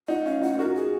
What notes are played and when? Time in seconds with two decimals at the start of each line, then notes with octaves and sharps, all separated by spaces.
0.08 D#4 F#5
0.25 C#4 F5
0.42 D#4 F#5
0.53 F4
0.58 D#4 F#4 A#4
0.75 G#4